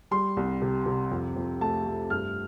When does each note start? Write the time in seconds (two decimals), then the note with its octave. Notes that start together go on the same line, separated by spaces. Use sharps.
0.11 G3 C6
0.37 C2
0.62 C3
0.86 C3
1.11 F2
1.36 F2
1.61 A3 A5
1.86 A3
2.10 G2 F6